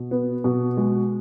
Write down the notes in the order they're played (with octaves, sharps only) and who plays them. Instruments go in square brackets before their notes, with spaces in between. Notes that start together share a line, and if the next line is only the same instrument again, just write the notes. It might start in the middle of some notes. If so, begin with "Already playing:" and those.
Already playing: [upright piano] B2
B3
B2
G#3